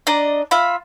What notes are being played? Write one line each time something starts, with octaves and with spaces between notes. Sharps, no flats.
D4 D5 D#5 A#5
F4 E5 B5